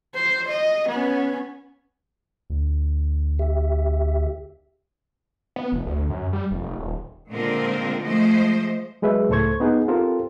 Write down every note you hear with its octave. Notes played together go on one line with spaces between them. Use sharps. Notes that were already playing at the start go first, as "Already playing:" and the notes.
C5
D#5
B3 C#4
D2
G4 E5
B3
F1
D2
F#2
G3
F1
D#1
A#2 D3 G#3 C4 F4 A#4
F3 G#3 A3 C5 D#5
F#3 G#3 G#4 B4 E5
C#2 A2 A4 C5 C#6 G#6
B3 D#4 G#4 F#5
C4 F4 G4 A4 A#4 C5